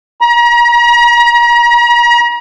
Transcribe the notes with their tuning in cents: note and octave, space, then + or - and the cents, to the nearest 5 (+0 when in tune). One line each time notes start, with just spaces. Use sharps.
A#5 +40